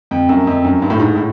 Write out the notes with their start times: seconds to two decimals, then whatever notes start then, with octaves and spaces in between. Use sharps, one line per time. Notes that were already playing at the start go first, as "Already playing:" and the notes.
0.11 F2
0.29 F#2
0.47 F2
0.65 F#2
0.82 G2
0.90 A2
1.00 G#2
1.16 A2